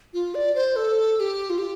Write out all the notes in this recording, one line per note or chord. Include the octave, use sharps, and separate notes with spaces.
F4
D5
C5
A4
A4
G4
F4
G4